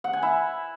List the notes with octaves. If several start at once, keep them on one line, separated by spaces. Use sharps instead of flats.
F#5
G#5
E4